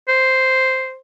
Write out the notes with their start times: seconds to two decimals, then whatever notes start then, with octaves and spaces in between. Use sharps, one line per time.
0.08 C5